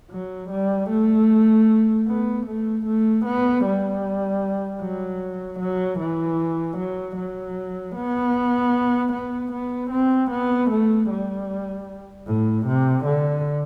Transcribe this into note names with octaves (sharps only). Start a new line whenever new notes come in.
F#3
G3
A3
B3
A3
A3
B3
G3
F#3
F#3
E3
F#3
F#3
B3
B3
B3
C4
B3
A3
G3
A2
C3
D3